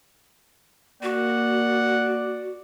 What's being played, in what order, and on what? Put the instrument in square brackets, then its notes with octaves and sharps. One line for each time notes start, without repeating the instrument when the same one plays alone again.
[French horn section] A#3 [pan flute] F#4 [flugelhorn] D5 [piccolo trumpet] F#5